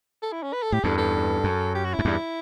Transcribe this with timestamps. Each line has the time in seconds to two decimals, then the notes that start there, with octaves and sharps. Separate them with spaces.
0.22 A4
0.32 E4
0.43 C#4
0.53 B4
0.62 A4
0.72 A2 G4
0.83 E2 G2 A4
0.98 A4
1.44 F#2
1.75 G4
1.85 F#4
1.94 F#2 E4
2.05 E2 G2